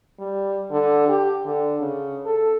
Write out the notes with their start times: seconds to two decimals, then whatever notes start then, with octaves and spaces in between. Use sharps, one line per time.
0.19 G3
0.71 D3
1.08 G4
1.45 D3
1.81 C#3
2.25 A4